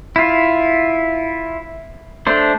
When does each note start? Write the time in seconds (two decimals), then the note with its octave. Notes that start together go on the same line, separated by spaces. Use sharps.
0.16 E4 F4
2.27 A3 D4 C5